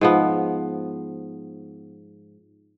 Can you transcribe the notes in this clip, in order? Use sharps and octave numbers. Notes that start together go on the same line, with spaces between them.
G#2 F3 B3